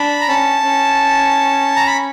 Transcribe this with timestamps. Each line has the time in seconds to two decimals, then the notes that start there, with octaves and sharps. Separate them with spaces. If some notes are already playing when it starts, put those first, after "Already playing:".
Already playing: D4 B5
0.21 A#5
0.28 C#4 A5
0.65 C#4
1.76 A#5
1.87 B5